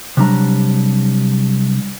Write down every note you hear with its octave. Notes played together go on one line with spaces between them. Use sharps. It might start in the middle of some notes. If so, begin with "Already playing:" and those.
C3 F#3 G3 D4 A#5